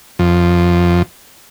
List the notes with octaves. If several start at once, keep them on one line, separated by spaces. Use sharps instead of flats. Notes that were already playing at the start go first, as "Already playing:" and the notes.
F2